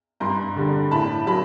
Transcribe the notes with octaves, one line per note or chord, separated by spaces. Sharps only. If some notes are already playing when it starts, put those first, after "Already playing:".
G2 A#5 C6
D3 G3
A2 A5 B5
F#3 A5 B5